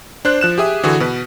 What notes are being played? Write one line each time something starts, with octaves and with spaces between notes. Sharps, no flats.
D4 C5 F#6
F3 F#6 E7
G4 G#4 E5 D#6
D3 E3 F#4 G#4
B2 B4